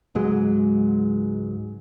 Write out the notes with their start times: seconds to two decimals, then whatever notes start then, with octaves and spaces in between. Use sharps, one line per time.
0.15 C#2 G#2 F#3 G#3